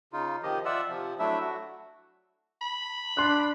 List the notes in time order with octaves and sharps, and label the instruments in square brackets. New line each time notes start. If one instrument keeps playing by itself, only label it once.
[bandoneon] C#3 D#4 F4
C3 D#3 F3 G4 D#5
F4 D5 E5 F#5 E6
C3 F3
F#3 A3 D4 E4 E5
F#4
[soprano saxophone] B5
[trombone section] D4 [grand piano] C6 F#6